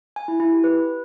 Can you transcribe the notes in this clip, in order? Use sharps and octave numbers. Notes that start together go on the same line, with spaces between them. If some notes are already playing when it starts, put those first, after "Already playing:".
G#5
E4
E4
G4
B4